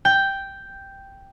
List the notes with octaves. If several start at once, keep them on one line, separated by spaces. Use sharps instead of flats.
G5